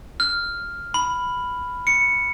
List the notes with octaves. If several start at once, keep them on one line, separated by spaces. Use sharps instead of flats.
F6
B5
C#7